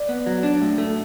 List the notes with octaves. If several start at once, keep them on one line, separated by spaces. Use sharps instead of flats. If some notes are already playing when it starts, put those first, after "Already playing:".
Already playing: D5
B3
F#3
D4
A2
A3